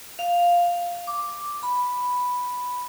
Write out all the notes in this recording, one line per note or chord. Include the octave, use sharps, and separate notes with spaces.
F5
D6
B5